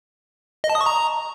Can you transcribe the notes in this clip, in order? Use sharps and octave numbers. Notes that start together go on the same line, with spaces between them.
D#5
A5
D#6
C#6
A#5